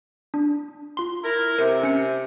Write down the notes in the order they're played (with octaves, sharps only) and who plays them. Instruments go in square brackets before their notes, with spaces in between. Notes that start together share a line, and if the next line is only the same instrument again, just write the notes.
[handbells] D4
F4 C6
[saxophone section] E4 A#4
[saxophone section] C3 [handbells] A#4
[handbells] C#4 C#7